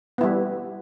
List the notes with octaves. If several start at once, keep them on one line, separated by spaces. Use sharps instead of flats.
G3 B3 E4